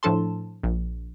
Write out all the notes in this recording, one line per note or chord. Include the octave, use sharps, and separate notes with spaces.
A2 F3 D4 A4 A5 C6
A#1